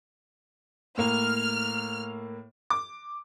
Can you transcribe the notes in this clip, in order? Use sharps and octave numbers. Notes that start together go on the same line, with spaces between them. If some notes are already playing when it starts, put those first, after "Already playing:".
A2 A#3 F6
D6